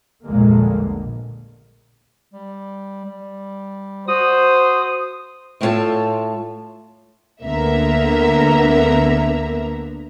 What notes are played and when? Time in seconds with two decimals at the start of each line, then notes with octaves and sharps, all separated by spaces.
0.24 A#1 E2 G2 D3 G#3 A#3
2.33 G3
3.04 G3
4.08 F#4 C5 D#6
5.61 A2 A3 E4 F4 C#5 A5
7.43 D2 D3 A#3 B3 E5 A#5